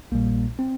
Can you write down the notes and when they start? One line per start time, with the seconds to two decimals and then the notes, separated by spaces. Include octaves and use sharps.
0.12 A#1 A#2 G3 A#3
0.59 C4